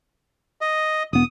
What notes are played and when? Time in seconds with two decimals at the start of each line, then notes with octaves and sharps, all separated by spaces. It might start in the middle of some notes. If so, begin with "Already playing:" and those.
0.61 D#5
1.13 E1 B3 D#6